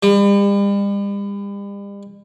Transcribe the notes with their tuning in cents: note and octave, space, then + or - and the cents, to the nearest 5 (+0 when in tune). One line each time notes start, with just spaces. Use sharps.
G3 +40